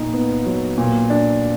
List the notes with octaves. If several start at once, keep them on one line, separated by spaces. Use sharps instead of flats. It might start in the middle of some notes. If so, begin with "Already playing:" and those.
Already playing: A#2 D#4
B3
F#3
A#2
D4